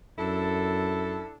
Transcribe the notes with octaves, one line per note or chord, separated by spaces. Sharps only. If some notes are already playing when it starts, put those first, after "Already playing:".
F#2 D4 E4 A4